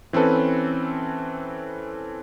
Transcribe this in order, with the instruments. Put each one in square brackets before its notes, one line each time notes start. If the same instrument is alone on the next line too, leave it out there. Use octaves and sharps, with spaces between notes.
[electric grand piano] E3 C4 C#4 A4 B4